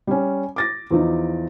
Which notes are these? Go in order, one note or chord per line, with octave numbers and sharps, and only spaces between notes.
G3 C#4
D6 A6 A#6
E2 F3 D#4